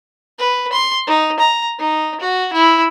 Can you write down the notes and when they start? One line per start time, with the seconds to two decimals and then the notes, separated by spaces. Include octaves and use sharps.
0.39 B4
0.72 C6
1.07 D#4
1.40 A#5
1.79 D#4
2.21 F#4
2.53 E4